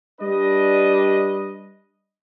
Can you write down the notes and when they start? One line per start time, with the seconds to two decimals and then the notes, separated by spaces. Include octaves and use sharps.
0.21 G3 D4 B4 D#5